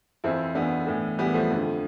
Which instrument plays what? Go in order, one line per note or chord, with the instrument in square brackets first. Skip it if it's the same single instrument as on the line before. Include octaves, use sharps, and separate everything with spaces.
[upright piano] F2 E3 C4 E4
F2 E3 B3 D4
A2 E3
A2 E3 G3 B3
F3 A3
F2 D3